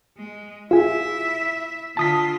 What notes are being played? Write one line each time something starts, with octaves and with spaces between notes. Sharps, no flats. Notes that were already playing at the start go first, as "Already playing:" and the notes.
G#3
E4 F4 G#4 E5
D3 F4 A5 D#6 B6